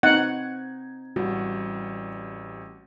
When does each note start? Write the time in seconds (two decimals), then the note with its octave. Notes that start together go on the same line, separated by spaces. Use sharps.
0.03 C4 D#4 F#5 G#6
1.16 A1 G3 F#4